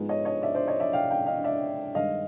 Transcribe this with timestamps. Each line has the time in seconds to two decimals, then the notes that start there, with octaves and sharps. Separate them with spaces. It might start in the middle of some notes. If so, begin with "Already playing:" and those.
Already playing: G#2 F3 G#3 B3 D#4
0.09 C#5 D#5
0.25 C#5 D#5
0.42 D5 E5
0.55 C5 D5
0.68 C#5 D#5
0.80 D5 E5
0.93 F5 G5
1.10 F5 G5
1.26 D#5 F5
1.44 D5 E5
1.95 G2 D#3 G#3 D#5 F5